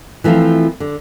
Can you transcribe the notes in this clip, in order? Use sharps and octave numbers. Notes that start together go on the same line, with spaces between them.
E3 F3 A3 C4 F4
D3